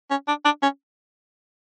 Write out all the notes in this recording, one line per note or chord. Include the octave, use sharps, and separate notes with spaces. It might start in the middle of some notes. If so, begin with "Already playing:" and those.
C#4
D4
D4
C#4